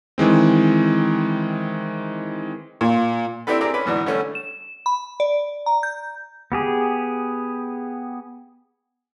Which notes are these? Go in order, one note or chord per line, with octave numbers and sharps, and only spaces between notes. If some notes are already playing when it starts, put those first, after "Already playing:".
D#3 E3 G#3 C4
A#2
C4 D4 E4 G4 A4 B4
C4 G4 G#4 A#4 D5 A#5
C#4 D4 B4
G#2 B2 E3 D4
D3 G3 A3 C#4
E7
B5
D5
A#5
G6
B3 G4 G#4